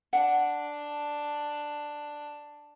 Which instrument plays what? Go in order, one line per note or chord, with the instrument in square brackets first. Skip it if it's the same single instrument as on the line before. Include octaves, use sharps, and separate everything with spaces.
[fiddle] D4 [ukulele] F#5